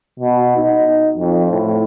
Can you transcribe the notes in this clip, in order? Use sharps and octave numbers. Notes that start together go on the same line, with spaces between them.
B2
D#4
F2
A2